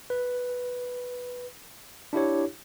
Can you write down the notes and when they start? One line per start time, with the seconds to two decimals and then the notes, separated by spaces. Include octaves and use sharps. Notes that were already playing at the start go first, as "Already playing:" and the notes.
0.10 B4
2.13 D4 E4 G4 C#5